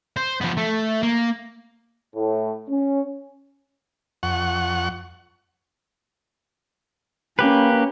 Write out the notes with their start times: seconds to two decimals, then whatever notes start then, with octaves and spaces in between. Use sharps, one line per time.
0.16 C5
0.41 F3 B3
0.57 A3
1.03 A#3
2.14 A2
2.70 C#4
4.23 F2 F#5 C#6
7.39 A#3 C#4 G4 B4